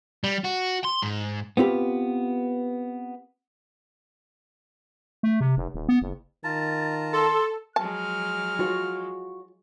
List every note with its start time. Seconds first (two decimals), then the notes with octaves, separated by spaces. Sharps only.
0.24 G3
0.44 F#4
0.84 C6
1.02 G#2
1.57 B3 C4 F4 G4 B4
5.23 A3
5.40 C3
5.57 F1
5.74 D#1
5.88 B3
6.02 F#1
6.44 D#3 F4 A5 A#5 A6
7.13 A4 C6
7.76 F3 F#3 G#3 A5 F6
8.59 F4 F#4 C#5